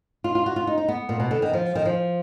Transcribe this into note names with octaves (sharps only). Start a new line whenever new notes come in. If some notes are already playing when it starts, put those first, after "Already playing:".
F4
F4
F#4
F4
D#4
D#4
B3
A#2
B2
D3
D#3
F3
D#3
F3